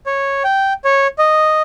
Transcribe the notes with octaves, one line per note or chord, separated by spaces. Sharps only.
C#5
G5
C#5
D#5